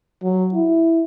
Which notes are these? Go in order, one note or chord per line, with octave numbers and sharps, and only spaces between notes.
F#3
E4